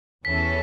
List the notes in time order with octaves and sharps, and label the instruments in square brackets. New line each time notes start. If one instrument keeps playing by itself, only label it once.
[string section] E2 E3 C#4 A4 [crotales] B6